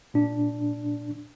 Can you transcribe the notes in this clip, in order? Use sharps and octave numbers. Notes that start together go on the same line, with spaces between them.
A#2 D4